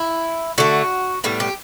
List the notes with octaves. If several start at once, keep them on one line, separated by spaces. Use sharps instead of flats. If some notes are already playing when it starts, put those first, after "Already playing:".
Already playing: E4
D3 A3 F#4
A2 G3 B3
G4